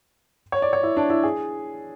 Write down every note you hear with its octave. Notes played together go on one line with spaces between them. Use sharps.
C#5
D5
C#5
E4
D4
E4
G#4